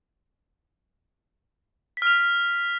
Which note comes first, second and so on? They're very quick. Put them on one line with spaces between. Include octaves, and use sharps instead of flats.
B6 F6 F7